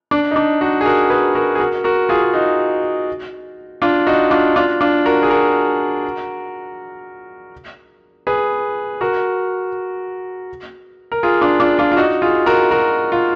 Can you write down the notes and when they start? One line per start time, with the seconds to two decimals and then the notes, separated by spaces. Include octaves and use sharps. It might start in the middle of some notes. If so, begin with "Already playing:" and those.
0.11 D4
0.31 D#4
0.36 D4
0.61 D#4 F#4
0.81 G#4
0.85 F#4 A#4
1.10 G#4 B4
1.35 F#4 A#4
1.55 G#4
1.59 F#4 A#4
1.84 F#4 A#4
2.09 F4 G#4
2.22 G#4
2.34 D#4 F#4
3.82 D4 F4
4.07 D#4 F#4
4.31 D4 F4
4.56 D4 F4
4.81 D4 F4
5.05 F#4 A#4
5.23 G#4
5.30 F#4 A#4
8.27 G#4 B4
9.01 F#4 A#4
11.12 A#4
11.23 F4 G#4
11.41 D4 F4
11.60 D4 F4
11.78 D4 F4
11.92 F4
11.97 D#4 F#4
12.22 F4 G#4
12.46 F#4 A#4
12.71 F#4 A#4
13.12 F4